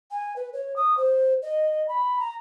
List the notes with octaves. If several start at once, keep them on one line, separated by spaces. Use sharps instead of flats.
G#5
B4
C#5
D#6
C5
D#5
B5
A#5